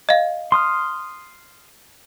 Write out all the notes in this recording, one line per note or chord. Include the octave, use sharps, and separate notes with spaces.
D#5 F5
C6 D#6 F6